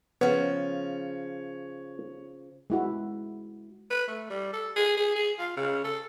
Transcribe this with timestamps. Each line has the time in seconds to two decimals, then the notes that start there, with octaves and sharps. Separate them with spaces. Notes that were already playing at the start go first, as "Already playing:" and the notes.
0.21 C#3 F3 B3 C#5
2.70 G#3 E4 F#4
3.91 B4
4.08 A3
4.30 G3
4.53 A4
4.76 G#4
4.97 G#4
5.15 G#4
5.39 F4
5.56 C#3
5.84 A4